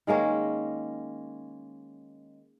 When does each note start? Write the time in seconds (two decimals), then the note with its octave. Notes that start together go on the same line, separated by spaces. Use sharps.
0.07 D#3 G#3 A#3 C#4